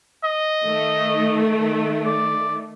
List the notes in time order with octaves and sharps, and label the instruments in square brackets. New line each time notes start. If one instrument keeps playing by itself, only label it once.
[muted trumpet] D#5
[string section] D#3 A3
[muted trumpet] D5